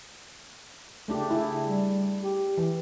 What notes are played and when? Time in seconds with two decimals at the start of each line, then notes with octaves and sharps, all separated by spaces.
1.08 C#3 A3 D4 G4
1.30 E4 G#4
1.62 G3
2.23 G4
2.58 E3